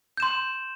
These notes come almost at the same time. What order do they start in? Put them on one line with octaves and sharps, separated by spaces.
G6 E7 C6